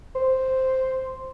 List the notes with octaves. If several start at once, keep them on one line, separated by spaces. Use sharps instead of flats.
C5